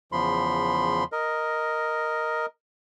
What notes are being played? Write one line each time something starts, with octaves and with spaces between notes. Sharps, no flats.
E2 C#3 F3 B5 C6
A#4 D#5